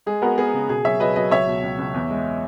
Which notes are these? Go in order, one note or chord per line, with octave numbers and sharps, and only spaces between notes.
G#3 G#4
B3 F#4 A#4
B3 G#4
C#3
B2 G#4
F#3 C#5 E5
F#3 B4 D#5
F#3 B4 D#5
C#2 C#5 E5
B2
C#2
C#2
E2
G#3